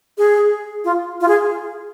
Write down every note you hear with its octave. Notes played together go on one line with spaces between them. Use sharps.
G#4
F4
F4
G#4